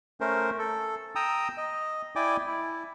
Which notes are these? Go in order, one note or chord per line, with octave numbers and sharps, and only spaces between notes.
A3 C#4 A#4 C5
A4
G5 A#5 D#6 E6
D#5
E4 D5 G5 G#5 D6
E4